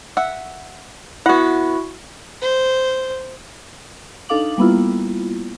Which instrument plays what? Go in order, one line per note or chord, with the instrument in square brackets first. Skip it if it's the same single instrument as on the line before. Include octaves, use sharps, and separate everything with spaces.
[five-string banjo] E5 F#5
[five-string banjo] B3 F#5 [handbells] E4 F#4
[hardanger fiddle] C5
[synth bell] D4 D#4 A4 F5 D6 F#7
G3 A#3 B3 E4 F4